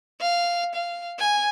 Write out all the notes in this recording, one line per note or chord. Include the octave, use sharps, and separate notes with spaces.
F5
F5
G#5